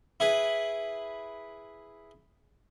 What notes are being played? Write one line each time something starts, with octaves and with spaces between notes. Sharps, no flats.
E4 G#4 B4